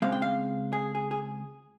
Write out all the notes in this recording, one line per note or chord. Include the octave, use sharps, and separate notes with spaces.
C#2 C#3 G#3 C4 F5
G5
F5
G#4
G#4
G#4